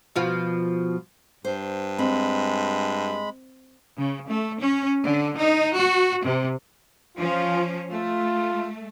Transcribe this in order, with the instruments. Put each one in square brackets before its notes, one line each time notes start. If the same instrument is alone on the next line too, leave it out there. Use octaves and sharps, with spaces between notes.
[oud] B2 F3 F4
[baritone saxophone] G2 [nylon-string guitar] C5
[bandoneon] G#3 B5 [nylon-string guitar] C4
[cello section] C#3
A3
C#4
D3
D#4
F#4
C3
[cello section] F3 C#4 [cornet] F4
[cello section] A3 [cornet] F4